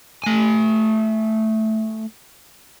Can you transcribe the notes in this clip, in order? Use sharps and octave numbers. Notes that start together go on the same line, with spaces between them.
A3 G#5